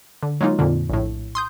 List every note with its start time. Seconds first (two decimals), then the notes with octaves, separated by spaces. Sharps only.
0.23 D3
0.41 F#3 G#3 A#3 D#4 F4
0.59 F2 A#2 D3
0.90 A#1 A2
1.35 C6 D#6 G6